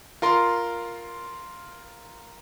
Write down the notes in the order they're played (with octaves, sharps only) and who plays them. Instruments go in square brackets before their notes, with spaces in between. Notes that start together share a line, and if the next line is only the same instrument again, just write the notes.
[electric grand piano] F4 A#4 C6